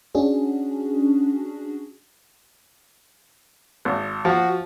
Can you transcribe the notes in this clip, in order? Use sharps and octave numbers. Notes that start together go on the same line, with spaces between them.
C#4 D4 F#4 G#4
G#1
F3 F#4